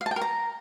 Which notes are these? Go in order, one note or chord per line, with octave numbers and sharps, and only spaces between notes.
F5
A5
G5
A#4
A#5